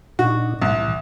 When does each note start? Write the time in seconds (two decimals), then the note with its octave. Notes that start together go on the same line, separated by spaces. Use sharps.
0.19 A#2 D4 D#4 F#4
0.62 C2 A2 E3